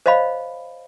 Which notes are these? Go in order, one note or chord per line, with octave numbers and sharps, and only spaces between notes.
C5 C#5 D#5 F5 B5